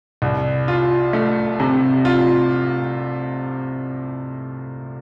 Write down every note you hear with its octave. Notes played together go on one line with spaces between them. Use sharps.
C2
F4
A3
C3
F4